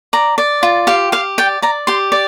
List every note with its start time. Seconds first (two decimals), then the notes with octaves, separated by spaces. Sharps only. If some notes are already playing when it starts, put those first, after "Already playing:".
0.13 D5 A#5
0.38 D5
0.63 F4
0.87 G4 F5
1.12 G4 F5
1.38 D5 G5
1.62 D5 A#5
1.87 G4 C6
2.12 D5